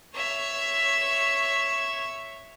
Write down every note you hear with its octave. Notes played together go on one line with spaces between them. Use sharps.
C#5 E5